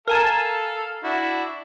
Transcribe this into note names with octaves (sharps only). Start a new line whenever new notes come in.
A4 A#4 F5 G#5 A5
D4 E4 F#4